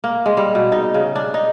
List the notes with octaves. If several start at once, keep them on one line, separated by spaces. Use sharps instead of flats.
A#3
G#3
G3
B2
D#4
C#3
D4
D#4